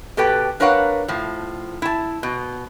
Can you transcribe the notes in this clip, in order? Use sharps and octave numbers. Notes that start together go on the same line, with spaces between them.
B2 G4 A4 B4 G5
D4 A#4 B4 C#5 F5 F#5
A2 F3
E4 A5
B2